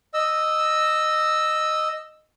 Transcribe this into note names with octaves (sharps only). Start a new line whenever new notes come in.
D#5 E6